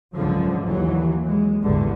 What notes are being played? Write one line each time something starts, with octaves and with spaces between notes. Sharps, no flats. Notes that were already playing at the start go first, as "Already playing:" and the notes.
C#2 G#2 D3 F3 F#3
D#2 E3 F#3
G#3
A1 E2 G2 D3 G3